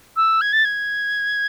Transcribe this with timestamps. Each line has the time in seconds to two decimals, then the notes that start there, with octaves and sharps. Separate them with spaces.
0.16 E6
0.41 G#6
0.53 A6
0.65 G#6